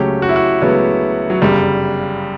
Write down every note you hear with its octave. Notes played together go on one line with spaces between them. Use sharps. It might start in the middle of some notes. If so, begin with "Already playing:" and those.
Already playing: C#2 C#3 F#3 A3 C#4 G4
F#4
E4
F#4
C#2 C#3 F#3 A3 B3 C#4
F#3
G1 F#2 C#3 G3